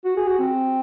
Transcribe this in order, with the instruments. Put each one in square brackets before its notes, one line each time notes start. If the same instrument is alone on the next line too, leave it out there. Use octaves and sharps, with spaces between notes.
[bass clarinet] F#4
G#4
F#4
C4